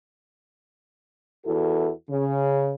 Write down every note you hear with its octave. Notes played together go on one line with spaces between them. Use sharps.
E2 E4 F#4 A4
C#3